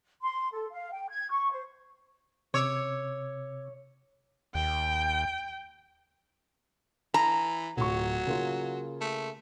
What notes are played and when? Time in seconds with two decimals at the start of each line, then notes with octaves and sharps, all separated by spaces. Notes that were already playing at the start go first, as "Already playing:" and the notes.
0.22 C6
0.53 A4
0.71 F5
0.93 G5
1.09 G#6
1.31 C#6
1.51 C5
2.54 C3 C#5 D6 E6
4.55 D#2 G5
7.14 E3 A#5
7.77 D1 F#3 F4 C#6
8.27 C#3 A#3 F4
9.01 A3